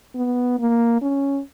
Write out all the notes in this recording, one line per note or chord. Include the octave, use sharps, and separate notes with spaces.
B3
A#3
C#4